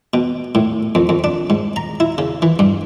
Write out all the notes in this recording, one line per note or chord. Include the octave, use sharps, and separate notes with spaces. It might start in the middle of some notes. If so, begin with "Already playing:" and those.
B2
A2
F2
F2
D4
G#2
A#5
E4
C#3
E3
G2